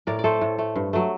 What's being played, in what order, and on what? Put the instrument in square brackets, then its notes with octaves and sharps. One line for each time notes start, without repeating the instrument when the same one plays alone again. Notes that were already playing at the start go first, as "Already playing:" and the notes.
[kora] A2 A#4 D5
D5
A3 A4 C5
A2
A3
G2
F#3 A3